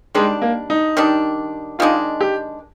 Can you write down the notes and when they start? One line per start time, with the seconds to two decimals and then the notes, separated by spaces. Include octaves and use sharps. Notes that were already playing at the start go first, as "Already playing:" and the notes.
0.15 D#3 G3 G#3 D4
0.42 A#3
0.70 D#4
0.97 D#3 G3 D4
1.79 D#3 G#3 D4 F4
2.21 G4